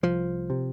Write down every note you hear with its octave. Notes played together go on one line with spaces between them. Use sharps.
C2 F3
C3